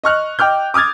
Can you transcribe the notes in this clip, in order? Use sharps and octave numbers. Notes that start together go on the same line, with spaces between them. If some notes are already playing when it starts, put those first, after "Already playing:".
D#5 C#6 F6 F#6
D#5 G5 D6 F6 G6
D6 D#6 F6 G#6 A6